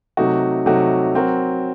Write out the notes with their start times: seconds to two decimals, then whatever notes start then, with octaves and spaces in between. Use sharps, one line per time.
0.17 C3 F#3 A3 D#4 F#4
0.66 C3 F#3 A3 D#4 F#4
1.15 F#3 C4 F#4 A#4